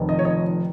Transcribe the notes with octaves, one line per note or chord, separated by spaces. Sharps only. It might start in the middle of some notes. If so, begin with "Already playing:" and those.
Already playing: F1 F2 D#3
D#5
C#5
D#5